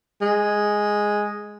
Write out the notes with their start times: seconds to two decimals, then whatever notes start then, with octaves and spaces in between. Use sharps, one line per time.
0.22 G#3